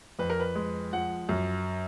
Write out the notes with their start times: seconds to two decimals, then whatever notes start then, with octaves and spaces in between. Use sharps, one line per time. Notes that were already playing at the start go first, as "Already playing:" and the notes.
0.19 F2 B4
0.30 A#4
0.40 B4
0.55 G#3
0.93 F3 F#5
1.29 F#2